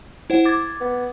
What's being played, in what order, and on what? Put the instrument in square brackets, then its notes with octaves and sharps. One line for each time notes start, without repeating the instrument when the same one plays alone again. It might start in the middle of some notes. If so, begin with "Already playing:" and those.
[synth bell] E4 C5 F#5
D6 G#6 A6
[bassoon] B3